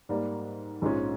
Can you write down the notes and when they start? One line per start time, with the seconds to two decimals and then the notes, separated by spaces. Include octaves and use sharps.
0.09 G#2 G3 A#3
0.82 A#1 G#2 F3 G#3 C#4